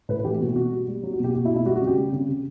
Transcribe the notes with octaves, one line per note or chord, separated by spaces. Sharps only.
A2 B4
E3 G4
B2 F#4
B2 F#4
G3
G3
F#3
F#4
B2
G4
B2 F#4
E4
B2
E4
G3 F#4
F#4
C#3
G4
G3
C#3
C#3